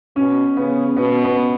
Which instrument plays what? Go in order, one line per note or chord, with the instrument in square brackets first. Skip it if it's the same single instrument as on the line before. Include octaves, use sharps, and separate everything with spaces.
[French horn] B2 [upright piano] C#4
[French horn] C#3 [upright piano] B3
[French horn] B2 [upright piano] B3
[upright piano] B3